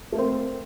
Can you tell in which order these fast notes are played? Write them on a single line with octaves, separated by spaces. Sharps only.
A3 A#3 C4